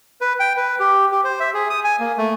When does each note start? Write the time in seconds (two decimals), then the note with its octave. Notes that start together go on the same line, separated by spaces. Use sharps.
0.21 B4
0.40 G5
0.57 B4
0.80 G4
1.12 G4
1.24 C5
1.40 E5
1.54 G#4
1.70 D#6
1.84 G#5
2.00 A#3
2.18 A3